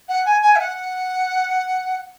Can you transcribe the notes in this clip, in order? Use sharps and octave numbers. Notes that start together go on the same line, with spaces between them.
F#5
G#5
G#5
E5
F#5